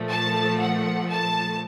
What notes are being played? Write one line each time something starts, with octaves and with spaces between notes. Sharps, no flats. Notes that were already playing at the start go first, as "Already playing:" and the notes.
Already playing: A#2 F3 A3
A5
F#5
A5